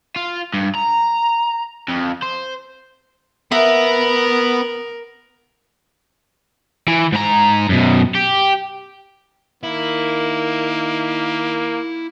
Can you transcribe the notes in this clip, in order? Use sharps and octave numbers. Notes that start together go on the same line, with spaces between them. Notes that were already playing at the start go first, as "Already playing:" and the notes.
F4
G2
A#5
F2
C5
B3 A#4 E5
E3
G#2 A#5
F#2 B2
G4
D#3 A#3 E4